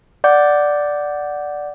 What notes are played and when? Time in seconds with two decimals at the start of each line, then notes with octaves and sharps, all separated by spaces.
0.24 D5 F#5 D6 G6